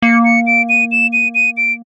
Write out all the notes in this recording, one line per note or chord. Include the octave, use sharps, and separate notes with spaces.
A#3 C#7
C#7
D7
D#7
E7
D#7
D#7
D7